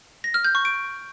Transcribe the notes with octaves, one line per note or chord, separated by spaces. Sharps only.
A#6
F6
G6
C#6
D7